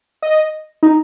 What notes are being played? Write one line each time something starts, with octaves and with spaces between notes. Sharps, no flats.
D#5
D#4